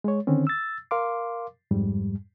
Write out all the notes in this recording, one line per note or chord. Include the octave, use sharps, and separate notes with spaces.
G#3 C#5
D3 D#3 C4 C#4
E6 A6
A#4 F5 C6 D6
F2 G#2 G3